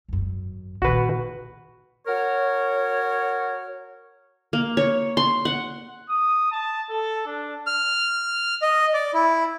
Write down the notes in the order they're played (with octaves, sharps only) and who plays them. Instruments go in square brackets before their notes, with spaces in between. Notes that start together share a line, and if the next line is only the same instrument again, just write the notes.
[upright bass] G#1 F#2
[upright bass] A#2 D#3 [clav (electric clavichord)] F#4 B4
[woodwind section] F#4 A#4 C#5
[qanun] A#3
C#5
C6
F#5
[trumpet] D#6
A5
A4
D4
[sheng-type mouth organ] F6
D#5
D5
E4